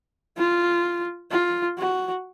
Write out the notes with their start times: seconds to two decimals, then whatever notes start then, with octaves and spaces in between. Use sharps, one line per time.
0.37 F4
1.31 F4
1.78 F#4